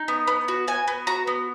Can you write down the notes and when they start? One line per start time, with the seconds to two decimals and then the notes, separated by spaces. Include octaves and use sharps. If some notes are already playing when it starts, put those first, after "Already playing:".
Already playing: D#4
0.08 B3
0.27 B3
0.48 F#4
0.68 F#4 G#5
0.88 B3
1.07 F#4 A#5
1.27 B3